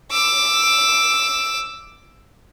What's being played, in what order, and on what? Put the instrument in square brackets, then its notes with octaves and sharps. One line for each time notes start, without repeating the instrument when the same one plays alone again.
[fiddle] D6 E6